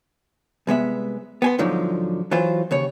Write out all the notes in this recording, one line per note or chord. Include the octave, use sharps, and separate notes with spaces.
C2 G#3 B3 E5
B3 G#5 C6
G#2 D3 F3 F#3 D#4
E3 F#3 F4 C5
D#2 C#3 C#5